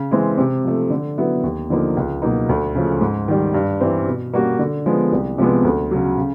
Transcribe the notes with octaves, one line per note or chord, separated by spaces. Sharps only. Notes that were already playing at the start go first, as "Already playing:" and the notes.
Already playing: C#3
E3 G#3 C4
C3
F3 A3
D3
F#3 B3 E4
D#2
D3 F3 A#3 D#4
C#2
B2 F#3 A#3 D#4
D2
C#3 F3 A3 C#4
G#2
D#3 G3
G2
E3 G3 C4
B2
G3 A#3 C#4 F#4
D3
F3 G#3 B3
C2
C3 F3 G#3 B3
D2
C#3 F#3
C#3